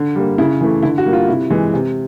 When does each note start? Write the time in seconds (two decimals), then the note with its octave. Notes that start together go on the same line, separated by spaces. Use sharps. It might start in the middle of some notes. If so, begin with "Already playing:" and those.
Already playing: D3
0.15 G3 A#3
0.38 C#3 E4
0.61 E3 A3
0.83 D3 E4
0.98 F#4
1.06 G3 A#3
1.13 F4
1.28 C3 E4
1.50 E3 G#3
1.74 C3